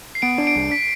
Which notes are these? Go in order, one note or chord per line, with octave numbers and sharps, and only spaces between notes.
C7
B3 D7
D4
D7
C2
B6